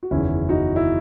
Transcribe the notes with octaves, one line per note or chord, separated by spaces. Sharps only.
F#4
F#1 E2 D#3 C#4 E4
D#4 F#4
E4